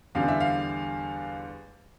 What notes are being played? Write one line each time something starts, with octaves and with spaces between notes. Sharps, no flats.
E2 D3 G3 F5
E5
F5